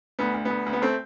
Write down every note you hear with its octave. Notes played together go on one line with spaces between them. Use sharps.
D2 B3
D2
D2 B3
D2
B3
A3 C4